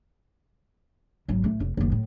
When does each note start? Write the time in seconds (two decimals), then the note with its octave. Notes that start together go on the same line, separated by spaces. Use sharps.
1.28 G#1 F#3
1.44 A1 A3
1.60 F1
1.77 F#1 D#2
1.92 A2